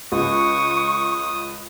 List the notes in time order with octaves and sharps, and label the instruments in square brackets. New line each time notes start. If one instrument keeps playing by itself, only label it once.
[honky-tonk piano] C#2 [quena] C#6 [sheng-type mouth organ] D#6